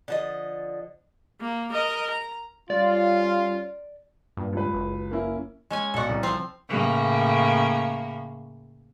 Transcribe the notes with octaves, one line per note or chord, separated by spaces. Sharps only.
D3 F3 D#5
A#3
A#4 D#5
A#5
G3 C#4 F4 D5
G2 A#2
C#2 B4
F#1
A#3 C#4 E4
G#3 C#4 G#5
B1 A4 D5 D#5 F#5 C#6
C2
F3 C4 C6
A2 C#3 A#3